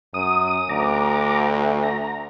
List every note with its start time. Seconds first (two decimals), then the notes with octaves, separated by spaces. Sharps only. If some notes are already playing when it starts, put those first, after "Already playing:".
0.14 F#2 D#6
0.69 D2 A#5 D6
1.83 A#5